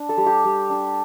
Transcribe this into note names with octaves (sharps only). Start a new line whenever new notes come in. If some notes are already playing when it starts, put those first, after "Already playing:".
Already playing: D4
A4
G3
G4
G3
D4